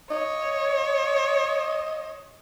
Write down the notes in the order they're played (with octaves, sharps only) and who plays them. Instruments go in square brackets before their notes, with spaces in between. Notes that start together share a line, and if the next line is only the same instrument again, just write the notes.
[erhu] C#5 [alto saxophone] D#5